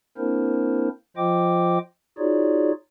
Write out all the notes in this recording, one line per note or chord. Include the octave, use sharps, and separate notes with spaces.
A#3 C4 D4 E4 A#4 C5
F3 F4 C5 D#5 G5 D6
D#4 F4 F#4 G#4 C#5 D5